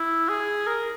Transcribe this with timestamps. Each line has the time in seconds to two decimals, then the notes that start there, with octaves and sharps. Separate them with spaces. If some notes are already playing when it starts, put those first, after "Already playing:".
Already playing: E4
0.29 G#4
0.67 A#4